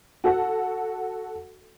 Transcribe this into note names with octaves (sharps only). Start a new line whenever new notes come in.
F#4 A4 F#5